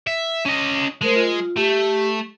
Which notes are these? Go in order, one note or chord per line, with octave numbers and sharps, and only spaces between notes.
E5
C#4 D#5
G#3 A3 A#4 C5
F4
A3 G4